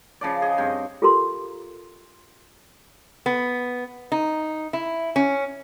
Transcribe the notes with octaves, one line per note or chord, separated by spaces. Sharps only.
C#3 F3 D5
G#4 D#5
G2 C4
F4 G4 A4 A#4 A#5 C6
B3
D#4
E4
C#4